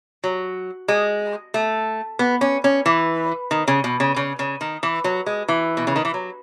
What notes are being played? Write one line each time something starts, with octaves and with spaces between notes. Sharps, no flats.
F#3
G#3
A3
B3
C#4
C#4
E3
D#3
C#3
B2
C#3
C#3
C#3
D#3
E3
F#3
G#3
E3
B2
C#3
D#3
E3
F#3